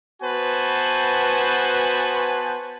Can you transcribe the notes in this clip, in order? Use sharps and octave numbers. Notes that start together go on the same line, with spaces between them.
B3 F#4 B4 C5 G#5 A5